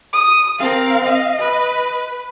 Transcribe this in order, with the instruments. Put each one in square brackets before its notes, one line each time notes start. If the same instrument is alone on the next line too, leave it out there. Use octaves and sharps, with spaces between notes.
[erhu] D#6
[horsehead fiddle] C4 A#4 [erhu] F5
[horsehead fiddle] D#5
[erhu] B4